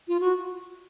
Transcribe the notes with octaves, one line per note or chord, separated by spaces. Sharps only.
F4
F#4